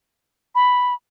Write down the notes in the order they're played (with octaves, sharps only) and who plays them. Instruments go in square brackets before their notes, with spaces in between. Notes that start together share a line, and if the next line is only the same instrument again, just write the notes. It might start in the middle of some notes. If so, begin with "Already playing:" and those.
[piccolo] B5